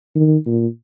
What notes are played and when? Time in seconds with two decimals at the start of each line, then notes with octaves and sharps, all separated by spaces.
0.16 D#3
0.46 A#2